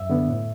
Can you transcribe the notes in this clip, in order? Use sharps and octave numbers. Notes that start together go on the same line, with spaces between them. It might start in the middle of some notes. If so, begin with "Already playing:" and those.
Already playing: F#2 E5
D3 B3 D4
A2